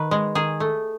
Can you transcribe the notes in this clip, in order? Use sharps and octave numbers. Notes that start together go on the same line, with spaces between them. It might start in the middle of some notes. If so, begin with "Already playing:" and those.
Already playing: D#3 B4
G#3
D#3 G#4
A3